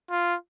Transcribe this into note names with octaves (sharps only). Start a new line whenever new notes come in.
F4